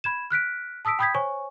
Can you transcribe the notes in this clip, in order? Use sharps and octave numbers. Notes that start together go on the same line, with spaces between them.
B5 G#6 E7
F6 F#6 B6 D7
A5 D#6 E6 B6 D7
G5 B5 D#6 G6 G#6 B6
C5 C#5 G#5 C#6